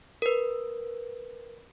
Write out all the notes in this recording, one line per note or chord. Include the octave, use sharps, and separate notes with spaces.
A#4 B4